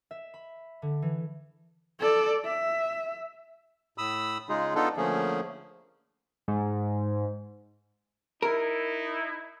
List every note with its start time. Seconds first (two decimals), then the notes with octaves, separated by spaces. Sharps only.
0.11 E5
0.34 B5
0.82 D3
1.02 E3
1.99 A4 D5
2.45 E5
3.98 A2 B5 D#6 E6
4.49 C#3 G#3 D#4 F4 G#4
4.75 B3 D4 D#4 F4 A4
4.97 D3 F3 A3 A#3 C#4 G#4
6.48 G#2
8.42 D#4 E4 A#4